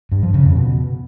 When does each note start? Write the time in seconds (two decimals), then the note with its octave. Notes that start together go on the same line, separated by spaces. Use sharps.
0.12 G2
0.23 F3
0.34 C#3
0.45 F2
0.56 B2